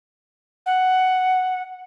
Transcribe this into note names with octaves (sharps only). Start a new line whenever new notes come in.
F#5